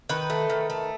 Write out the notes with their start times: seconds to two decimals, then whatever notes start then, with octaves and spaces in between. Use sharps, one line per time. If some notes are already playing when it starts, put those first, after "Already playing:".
0.09 D#3 B4
0.30 A3
0.50 D#3
0.70 A3